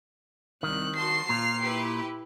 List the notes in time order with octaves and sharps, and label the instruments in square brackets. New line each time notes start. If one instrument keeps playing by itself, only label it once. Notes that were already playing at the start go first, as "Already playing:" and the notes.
[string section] C2 [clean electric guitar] D#3 [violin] F#6
[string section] F#4 A5 C6 [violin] C7
[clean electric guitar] A#2 [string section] F4 F6
[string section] E4 G4 B4